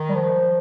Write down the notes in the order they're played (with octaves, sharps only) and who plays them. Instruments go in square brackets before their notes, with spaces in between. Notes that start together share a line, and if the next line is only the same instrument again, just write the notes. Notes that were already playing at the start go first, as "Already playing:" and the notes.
Already playing: [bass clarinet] D#3
[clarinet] G3
F3